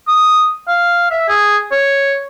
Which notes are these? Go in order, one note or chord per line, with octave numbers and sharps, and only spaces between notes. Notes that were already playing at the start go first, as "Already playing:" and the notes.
D#6
F5
E5
G#4
C#5